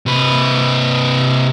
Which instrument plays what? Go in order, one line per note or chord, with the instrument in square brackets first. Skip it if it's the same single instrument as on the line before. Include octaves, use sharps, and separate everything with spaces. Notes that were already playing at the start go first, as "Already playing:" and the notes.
[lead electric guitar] C3 B4